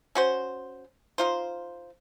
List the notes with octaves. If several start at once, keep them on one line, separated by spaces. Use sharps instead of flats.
C#4 F#4 C5
D#4 F4 C5